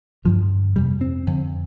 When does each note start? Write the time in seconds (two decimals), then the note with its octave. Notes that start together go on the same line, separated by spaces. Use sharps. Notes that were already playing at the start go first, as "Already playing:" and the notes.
0.25 G2 D3 F3
0.76 F2 C3 G3
1.01 C4
1.27 F2 D3